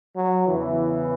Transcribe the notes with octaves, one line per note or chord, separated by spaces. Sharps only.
F#3
E2 C#3 E3